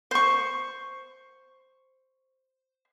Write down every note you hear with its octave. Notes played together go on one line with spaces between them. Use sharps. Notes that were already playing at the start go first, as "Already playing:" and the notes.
C5 C#6